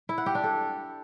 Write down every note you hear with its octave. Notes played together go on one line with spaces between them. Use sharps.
E4
F#5
G4
D4
A4